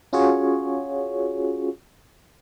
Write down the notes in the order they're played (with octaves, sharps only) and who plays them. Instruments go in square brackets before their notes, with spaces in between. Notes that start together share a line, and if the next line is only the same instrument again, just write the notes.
[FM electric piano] C#4 F4 F#4 G#4 C#5